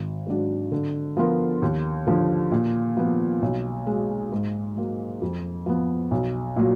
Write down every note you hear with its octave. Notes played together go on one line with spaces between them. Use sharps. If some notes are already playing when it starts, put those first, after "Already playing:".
Already playing: G#1
G#2 F#3 D4 F#4
D3
F3 B3 F4 A#4
D#2
D3 F3
A#2
F3 B3
B1
B2 G#3
G#2
F#3 A#3
F2
F3 B3
B1
A#2 F#3